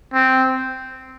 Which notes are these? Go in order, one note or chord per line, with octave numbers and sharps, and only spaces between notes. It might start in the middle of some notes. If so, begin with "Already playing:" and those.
C4